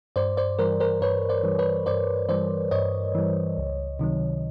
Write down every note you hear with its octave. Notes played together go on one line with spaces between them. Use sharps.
G2 C5 D5
C5 D5
E3 G3 A#4 C5
A#4 C5
G2 B4 C#5
C5 D5
E3 G3
B4 C#5
G2 C5 D5
E3 G3 C5 D5
G2 C#5 D#5
E3 G3
C#2
C3 D#3 F#3